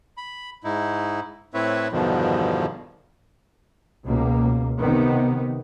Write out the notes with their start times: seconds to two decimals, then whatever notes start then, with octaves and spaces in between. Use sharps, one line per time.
0.17 B5
0.64 G#2 D#4 E4
1.54 A2 C4 E4 B4 C#5 E5
1.92 E2 G2 B2 D3 D#3 F3
4.04 C#2 B2 A#3
4.78 C3 D#3 B3